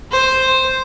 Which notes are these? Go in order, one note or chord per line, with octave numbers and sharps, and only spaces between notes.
C5